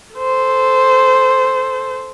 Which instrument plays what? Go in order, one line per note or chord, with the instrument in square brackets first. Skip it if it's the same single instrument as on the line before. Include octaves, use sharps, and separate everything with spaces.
[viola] A4 C5